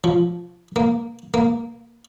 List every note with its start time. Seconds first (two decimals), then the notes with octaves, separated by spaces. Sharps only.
0.04 F3
0.76 A#3
1.34 A#3